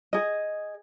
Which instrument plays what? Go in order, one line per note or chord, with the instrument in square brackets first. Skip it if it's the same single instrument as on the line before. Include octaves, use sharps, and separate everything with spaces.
[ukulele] G#4 D#5